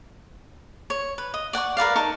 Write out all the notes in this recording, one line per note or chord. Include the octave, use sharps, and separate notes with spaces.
C#5
B4
D#5
D5 F#5 G5 C#6
A#4 B4 D5 F5
D#4 A#4 A5 C#6